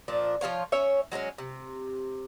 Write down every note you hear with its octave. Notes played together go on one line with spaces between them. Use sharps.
A#2 F3 D4
F3 F#3 F4 C#5
C#4 C#5 E5
F#3 G#3 A3 C#4
C3